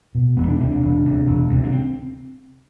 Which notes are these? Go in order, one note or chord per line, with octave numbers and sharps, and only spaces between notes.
B2
E1 B3
D4
D2 C3 C4
D4
E1
D2 C3
E1
D2 C3
D4
C4